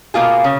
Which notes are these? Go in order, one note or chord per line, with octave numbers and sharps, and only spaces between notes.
B2 A#3 F4 G#4
C#3